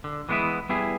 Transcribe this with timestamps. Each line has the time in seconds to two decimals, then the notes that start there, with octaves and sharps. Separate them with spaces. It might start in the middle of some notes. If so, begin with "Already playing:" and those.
0.04 D3
0.29 E3 G#3 B3 D4 E4
0.69 G3 B3 E4 G#4